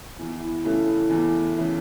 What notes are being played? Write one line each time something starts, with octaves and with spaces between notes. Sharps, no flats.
E2 E4
D#4
E4
C#3 E3 A3
E2
C#3 E3 A3